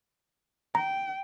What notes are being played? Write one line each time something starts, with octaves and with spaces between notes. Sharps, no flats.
G5 A#5